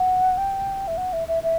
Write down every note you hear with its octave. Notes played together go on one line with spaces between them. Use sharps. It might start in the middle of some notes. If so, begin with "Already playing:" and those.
Already playing: F#5
G5
E5
F#5
E5
E5
E5